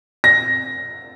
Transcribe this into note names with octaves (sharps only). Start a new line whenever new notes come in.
A#6